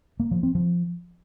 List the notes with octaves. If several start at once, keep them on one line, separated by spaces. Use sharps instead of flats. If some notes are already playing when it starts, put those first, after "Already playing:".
A#3
F3
C4
F3